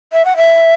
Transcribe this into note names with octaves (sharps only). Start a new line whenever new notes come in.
E5
F#5
E5